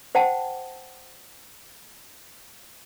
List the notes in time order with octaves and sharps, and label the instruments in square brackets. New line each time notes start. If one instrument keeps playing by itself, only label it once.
[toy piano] C5 F#5 G5 A5